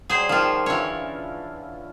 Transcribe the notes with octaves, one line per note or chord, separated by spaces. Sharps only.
F#3 G3 G#4 C5
D#3 F3 F4
D3 E3 C#4 F4 C#5